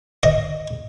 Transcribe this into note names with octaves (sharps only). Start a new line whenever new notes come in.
D#5